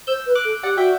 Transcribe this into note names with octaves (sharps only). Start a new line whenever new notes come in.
C5 E6 G6
B4
D6 F#6
A4
G4 D5 F#5
F#4 E5 G5